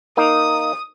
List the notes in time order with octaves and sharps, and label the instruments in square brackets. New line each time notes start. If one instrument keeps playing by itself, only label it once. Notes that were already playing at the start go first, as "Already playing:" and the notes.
[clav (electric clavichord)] A#3 D#4 [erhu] D#6